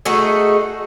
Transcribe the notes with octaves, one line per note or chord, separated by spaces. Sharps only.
A3 D#4 F#4 G#4